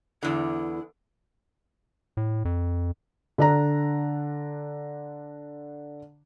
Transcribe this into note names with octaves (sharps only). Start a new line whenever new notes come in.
E2 D3 E4
A2
F2
D3 D4 A#5